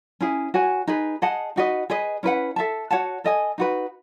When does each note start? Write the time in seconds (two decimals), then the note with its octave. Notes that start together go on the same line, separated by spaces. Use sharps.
0.21 C#4 E4 G#4
0.54 F#4 C#5 G#5
0.87 D#4 G#4 B4
1.22 G#4 D#5 F#5 A5
1.56 D#4 F#4 B4 D#5
1.90 G#4 B4 D#5
2.23 C#4 E4 B4 F#5
2.56 A4 E5 A5
2.91 F#4 C#5 F#5 A5
3.24 A4 D#5 G#5
3.58 D#4 F#4 B4